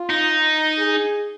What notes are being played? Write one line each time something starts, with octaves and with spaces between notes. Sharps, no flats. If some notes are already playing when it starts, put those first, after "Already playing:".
Already playing: F4
D#4
G#4